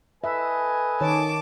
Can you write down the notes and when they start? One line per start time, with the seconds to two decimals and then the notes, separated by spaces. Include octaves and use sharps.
0.24 A4 B4 D#5 E5 G#5
1.01 D#3 C#5 A5 D6